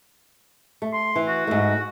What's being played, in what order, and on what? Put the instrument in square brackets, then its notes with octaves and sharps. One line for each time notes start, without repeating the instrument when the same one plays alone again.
[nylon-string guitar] A3
[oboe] C6
[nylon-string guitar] E3
[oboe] F#4
[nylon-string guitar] G#2 A3